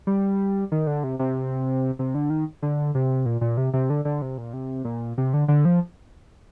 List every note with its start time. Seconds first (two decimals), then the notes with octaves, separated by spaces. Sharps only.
0.07 G3
0.72 D#3
0.87 D3
1.04 C3
1.19 C3
1.99 C3
2.15 D3
2.30 D#3
2.62 D3
2.95 C3
3.26 A#2
3.41 A#2
3.57 C3
3.73 C3
3.90 D3
4.05 D3
4.22 C3
4.38 A#2
4.53 C3
4.85 A#2
5.18 C3
5.34 D3
5.48 D3
5.65 F3